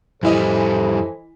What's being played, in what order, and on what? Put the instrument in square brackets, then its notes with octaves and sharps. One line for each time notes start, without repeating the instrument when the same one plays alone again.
[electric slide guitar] F2 G3 [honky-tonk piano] E3 E4 D#5 [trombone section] A4 C5